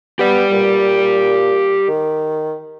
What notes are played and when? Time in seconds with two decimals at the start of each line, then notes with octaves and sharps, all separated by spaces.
0.19 B3 G4 D5
0.52 A#2
1.88 D#3